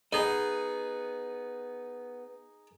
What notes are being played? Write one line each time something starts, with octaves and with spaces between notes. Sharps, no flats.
B3 D#4 G#4 D#5